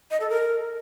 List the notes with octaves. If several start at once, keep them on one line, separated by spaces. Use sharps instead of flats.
D#5
A4
A#4